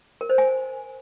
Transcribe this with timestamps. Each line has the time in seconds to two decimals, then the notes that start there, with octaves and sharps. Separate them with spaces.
0.21 A#4
0.30 C5
0.38 G#5